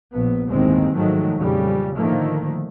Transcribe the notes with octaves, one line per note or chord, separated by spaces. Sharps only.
A#1 B3
G1 D#2 A2 D#3 G#3 C4
G#2 D#3 F3 F#3 G#3 A3
A#1 F2 C#3 G3
A2 D3 D#3 F3 A3 A#3